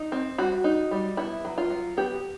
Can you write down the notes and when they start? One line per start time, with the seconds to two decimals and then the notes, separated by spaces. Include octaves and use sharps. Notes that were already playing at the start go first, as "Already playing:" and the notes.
Already playing: D#4
0.12 C4
0.38 G3 F#4
0.64 D#4
0.91 G3
1.17 B3 E4
1.45 F#3
1.58 F4
1.70 F#3
1.97 B3 G4